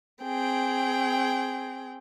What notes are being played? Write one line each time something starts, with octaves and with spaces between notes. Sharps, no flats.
C4 G#4 G5